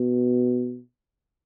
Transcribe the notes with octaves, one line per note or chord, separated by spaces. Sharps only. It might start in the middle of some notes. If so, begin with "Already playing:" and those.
Already playing: B2